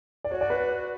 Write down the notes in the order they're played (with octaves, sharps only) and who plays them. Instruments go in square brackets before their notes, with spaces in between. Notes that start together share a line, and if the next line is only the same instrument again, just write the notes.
[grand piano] D5
[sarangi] F#4 [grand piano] C#5
[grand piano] D5
B4